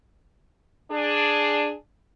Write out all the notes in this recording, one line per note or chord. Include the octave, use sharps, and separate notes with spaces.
D4 G#4